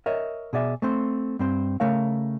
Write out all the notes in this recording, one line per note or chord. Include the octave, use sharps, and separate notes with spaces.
A#4 C#5 D#5 E5
B2 G#4 D5 E5
A3 C4 C5
G2 C4 C5
C#3 A3 A#4 C#5 F5